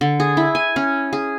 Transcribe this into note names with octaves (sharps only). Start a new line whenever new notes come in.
D3
G#4
E4
G#5
C#4
G#4